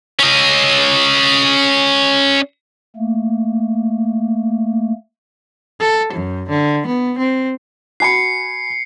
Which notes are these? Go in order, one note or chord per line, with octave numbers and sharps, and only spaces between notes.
C#4 D#5
A3 A#3
A4
F#2
D3
B3
C4
F#4 G#5 B5 C7 C#7